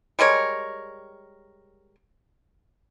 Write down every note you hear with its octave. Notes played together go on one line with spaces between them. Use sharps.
G3 G#3 A#4 C#5